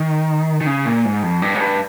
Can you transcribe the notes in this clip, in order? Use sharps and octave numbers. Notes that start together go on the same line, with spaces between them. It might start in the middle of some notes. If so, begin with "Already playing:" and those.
Already playing: D#3
D#3
C#3
A#2
G#2
F2
G2
G#2
G2